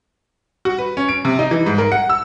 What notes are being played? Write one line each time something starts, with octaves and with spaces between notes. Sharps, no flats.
F#4
B4
C#4
D7
C3
D#4
E3
G#2
A#4
F#5
E6